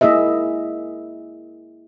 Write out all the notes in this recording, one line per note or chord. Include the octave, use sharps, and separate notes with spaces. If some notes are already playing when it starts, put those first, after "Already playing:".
A#3 E4 G#4 D#5 E5